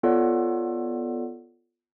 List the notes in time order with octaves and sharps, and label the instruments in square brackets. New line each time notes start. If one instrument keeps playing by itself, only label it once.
[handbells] B3 F4 A4 C#5 D5 F#5